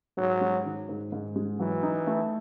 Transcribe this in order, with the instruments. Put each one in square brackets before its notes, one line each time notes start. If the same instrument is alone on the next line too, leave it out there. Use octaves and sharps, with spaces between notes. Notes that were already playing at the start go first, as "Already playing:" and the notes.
[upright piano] G#2 [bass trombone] F#3
[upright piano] G#3
D#3
G#2
G#2
G#3
[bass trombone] E3 [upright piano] F#3
[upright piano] D#4
A3